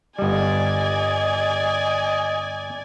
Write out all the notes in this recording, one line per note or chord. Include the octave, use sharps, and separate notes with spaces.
G1 G3 D5 D#5 G#5